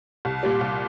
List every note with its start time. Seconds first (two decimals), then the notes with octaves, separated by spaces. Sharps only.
0.25 C2
0.43 A#2 G3
0.61 C2